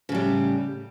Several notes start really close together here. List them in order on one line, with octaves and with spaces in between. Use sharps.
C#3 A2 G3